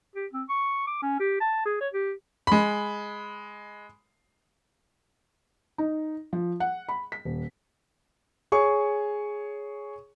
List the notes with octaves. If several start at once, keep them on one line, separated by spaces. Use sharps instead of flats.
G4
C4
C#6
D6
C#4
G4
A5
G#4
C#5
G4
G#3 B5
D#4
F3
F#5
B5
B6
D#1
G#4 C#5 C#6